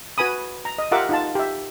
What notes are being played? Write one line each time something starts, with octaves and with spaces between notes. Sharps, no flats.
F#4 B4 G#5 B5 D#6
A#5
D#5
F4 G4 A#4 E5 F#5 D6
D#4 F4 A5
G4 E5